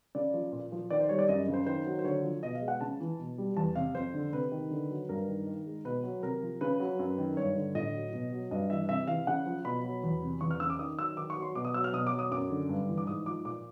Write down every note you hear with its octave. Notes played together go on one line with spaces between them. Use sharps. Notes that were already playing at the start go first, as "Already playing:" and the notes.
C#3 D5
F3
A#2
F3
D#3 D5
C5
G3 C#5
D5
F#2 D#5
C#3
C5
D#3 C5
F#3
C5
D3 C#5
F3
B2 D#5
F5
G#3
F#5
C#3 A5
E3
B2
G3
E2 A5
C3 F5
F2 C5
D3
C3 B4
D#3
D3
F#3
G2 A#4
D#3
D#3
G#3
B2 B4
F#3
C3 A#4
F3
C#3 B4
F#3
F#2
D#3
G2 C#5
D3
A2 D#5
F#3
B2
F#3
G2 D#5
E3 E5
C3 E5
E3 F5
C#3 F#5
F3
B2 B5
F#3
E2
C3
E2 C#6
F6
C#3 E6
D6
D#3 D#6
F#3 E6
D#3 D6
C#6
F#3
C6
B2 D6
D#6
F#3 E6
F6
B2 D#6
D6
F#3
D#6
F#2 D6
D3
G2
E3
D6
G#2 D#6
F3 D6
A#2 D6